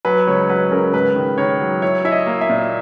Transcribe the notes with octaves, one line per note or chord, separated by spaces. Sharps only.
F#3 B4
C#2 C#5
F#3 B4
C#3 A#4
G#2 B4
D#3
D#3 C#5
F#3
E4 C#5
E4 E5
D#5
A#3
E5
A#2